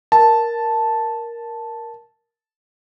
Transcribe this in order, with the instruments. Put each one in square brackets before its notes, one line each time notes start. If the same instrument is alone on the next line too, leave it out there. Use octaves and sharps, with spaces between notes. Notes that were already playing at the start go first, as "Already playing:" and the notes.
[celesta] A#4 [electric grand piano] A5